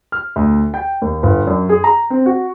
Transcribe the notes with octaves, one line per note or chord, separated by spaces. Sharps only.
F6
D2
G5
D#2
G1
F#2
G#4
A#5
C4
F#4